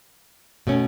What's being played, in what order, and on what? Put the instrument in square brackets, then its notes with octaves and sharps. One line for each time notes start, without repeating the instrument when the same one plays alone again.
[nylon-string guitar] B2 A3 C#4